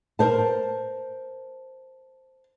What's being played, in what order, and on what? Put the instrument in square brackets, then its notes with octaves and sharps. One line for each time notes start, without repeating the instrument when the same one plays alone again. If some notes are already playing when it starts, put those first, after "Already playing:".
[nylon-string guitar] A#4 C5 A5